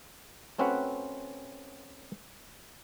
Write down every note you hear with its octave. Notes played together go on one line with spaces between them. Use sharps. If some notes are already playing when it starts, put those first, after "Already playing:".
A3 C4 C#4 F#4 B4 F#5